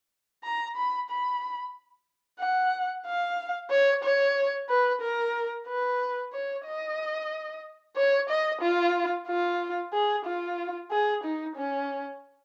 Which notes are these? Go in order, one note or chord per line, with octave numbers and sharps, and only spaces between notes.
A#5
B5
B5
F#5
F5
C#5
C#5
B4
A#4
B4
C#5
D#5
C#5
D#5
F4
F4
G#4
F4
G#4
D#4
C#4